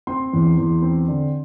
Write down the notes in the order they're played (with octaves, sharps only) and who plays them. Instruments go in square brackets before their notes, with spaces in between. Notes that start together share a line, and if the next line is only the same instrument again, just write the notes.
[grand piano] C4 C6
E2
E2
C4
D3